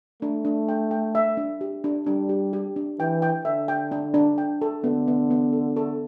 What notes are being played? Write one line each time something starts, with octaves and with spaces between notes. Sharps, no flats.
A3 D4
D4
G5
G5
E5
D4
G4
D4
G3 D4
G4
G4
D4
E3 G5
G5
D3 E5
G5
D4
D4
G5
A4
D3 B3
B3
B3
A4
A4